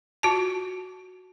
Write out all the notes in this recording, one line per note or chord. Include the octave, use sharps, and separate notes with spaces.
F4 F#4 A5